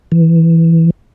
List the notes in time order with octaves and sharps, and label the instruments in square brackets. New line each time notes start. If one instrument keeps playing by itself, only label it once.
[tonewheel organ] E3